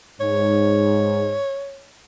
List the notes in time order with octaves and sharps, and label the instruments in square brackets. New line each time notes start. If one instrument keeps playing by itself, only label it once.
[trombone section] G#2 [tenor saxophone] C#5